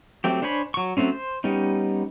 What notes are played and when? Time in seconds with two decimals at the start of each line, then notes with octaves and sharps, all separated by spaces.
0.24 F#3 A3 C4 G4
0.42 D4 C5 C#5 G#5 B5
0.74 F#3 C#6
0.97 F#3 A3 C4 C#4
1.12 C5
1.44 G3 B3 C#4 D#4